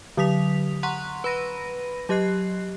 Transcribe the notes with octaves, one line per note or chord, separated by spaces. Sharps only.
D3 F#3 D#6 B6 F7
F#5 A#5 C6 C#6 F#6
B4 B5 A#6 D#7
F#3 G4 D#5 F#6 C7